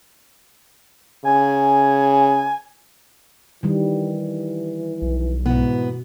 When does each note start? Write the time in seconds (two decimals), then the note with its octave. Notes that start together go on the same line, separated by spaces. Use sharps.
1.25 C#3 G#5
3.63 D#3 E3 G3
5.02 B1
5.46 G#2 B2 E3 B3